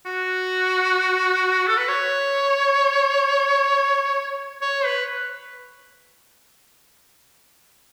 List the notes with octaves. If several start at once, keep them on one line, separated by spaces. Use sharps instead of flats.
F#4
A4
B4
C#5
C#5
B4